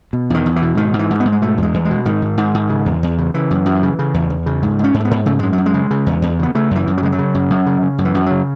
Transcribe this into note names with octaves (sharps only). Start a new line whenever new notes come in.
B2
E2 D#3
E2
E3
B2
G#2 D#3
G#2
E3
G#2
B3
G#2
G#3
B2 A3
E2
G#3
E2
G#3
B2
G#2 D#3
G#2
G#2
G#2
C#3
E2
E2
C#3
C#3 E3
F#2
F#2
C#3
C#3
E2
E2
C#3
G#2
G#2 C#4
G#2
A3
B3
G#2
C#3 A3
F#2 G#3
F#3
F#2
G#3
C#3
C#3
E2
E2
C#3 B3
C#3 A3
F#2 E3
F#2
F#3
C#3 G#3
F#3
C#3
F#2
F#2
C#3
C#3
F#2
E3
F#2
C#3 F#3